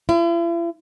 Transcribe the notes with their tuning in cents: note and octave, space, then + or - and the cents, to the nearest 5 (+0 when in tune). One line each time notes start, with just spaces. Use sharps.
E4 +45